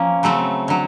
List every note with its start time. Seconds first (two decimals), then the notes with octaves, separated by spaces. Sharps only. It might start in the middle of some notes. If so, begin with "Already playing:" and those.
Already playing: F3 A#3 C#4
0.23 C#3 F#3 A3 C4
0.68 D3 F#3